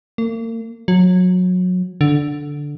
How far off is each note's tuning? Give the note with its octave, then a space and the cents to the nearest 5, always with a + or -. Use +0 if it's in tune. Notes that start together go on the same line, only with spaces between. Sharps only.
A#3 -40
F#3 -25
D3 -5